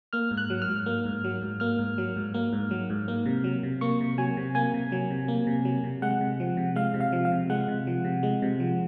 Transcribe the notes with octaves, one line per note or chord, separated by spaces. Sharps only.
A#3 F6
G#2
F#6
F#3
F6
G#2
A#3
G#2
F#3
G#2
A#3 F6
G#2
F#3
G#2
A#3
G#2
F#3
G#2
A#3
C3
F#3
C3
A#3 C#6
C3
F#3 G#5
C3
A#3 G#5
C3
F#3
C3
A#3
C3
F#3
C3
G#3 F#5
C3
F3
C3
G#3 F5
C3
F5
F3
F5
C3
G#3 F#5
C3
F3
C3
G#3
C3
F3